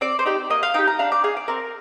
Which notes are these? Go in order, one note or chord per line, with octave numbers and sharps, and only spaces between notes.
C4 D5
C5
D#4 G4 D5
A#3 D#5
F5
D#4 G4 G5
A#5
D4 F5
D5
G#4 F5
D5
C4 A#4